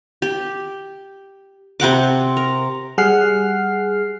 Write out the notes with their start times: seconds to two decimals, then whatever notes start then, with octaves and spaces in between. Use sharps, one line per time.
0.22 G4
1.80 C3 C4 F#5 D6
2.37 A#4
2.98 G3 G#4 F#5 F6 C7